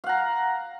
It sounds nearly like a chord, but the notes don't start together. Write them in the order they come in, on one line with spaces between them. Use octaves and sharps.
F5 F#5 A#5